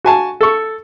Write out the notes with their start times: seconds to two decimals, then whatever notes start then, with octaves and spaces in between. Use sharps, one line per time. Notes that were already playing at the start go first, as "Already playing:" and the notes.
0.05 F#4 G#5 A5
0.41 A4 C#6